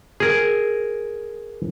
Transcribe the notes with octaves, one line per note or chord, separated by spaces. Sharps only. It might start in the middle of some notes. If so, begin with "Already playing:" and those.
G#4 A#4